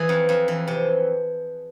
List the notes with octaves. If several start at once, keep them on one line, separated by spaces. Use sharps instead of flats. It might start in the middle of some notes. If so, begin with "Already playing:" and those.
Already playing: E3 G#4
F2
F2
E3
C3